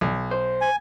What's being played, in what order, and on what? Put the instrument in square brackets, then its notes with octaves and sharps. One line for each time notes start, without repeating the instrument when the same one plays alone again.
[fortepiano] B1
[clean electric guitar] C5
[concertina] G#5